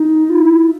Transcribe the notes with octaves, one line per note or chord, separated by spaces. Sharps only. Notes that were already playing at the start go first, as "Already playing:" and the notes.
Already playing: D#4
F4
E4